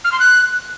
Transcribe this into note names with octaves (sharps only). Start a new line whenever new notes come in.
F6
C6
F#6